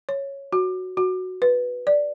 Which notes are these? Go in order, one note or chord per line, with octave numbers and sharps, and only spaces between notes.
C#5
F#4
F#4
B4
D5